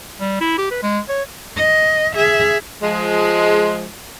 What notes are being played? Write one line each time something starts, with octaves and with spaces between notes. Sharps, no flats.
G3
E4
G4
B4
G#3
C#5
D#5
G#4 E5
F3 G#3